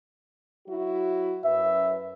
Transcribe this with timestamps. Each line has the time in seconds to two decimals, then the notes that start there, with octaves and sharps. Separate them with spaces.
0.67 F#3 E4 F#4
1.44 F#2 B4 E5